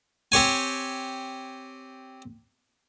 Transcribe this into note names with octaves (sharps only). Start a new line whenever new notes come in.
C4 G4 C#5 G#5